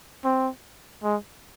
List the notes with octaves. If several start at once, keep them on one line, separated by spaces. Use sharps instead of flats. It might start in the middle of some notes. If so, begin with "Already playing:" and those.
C4
G#3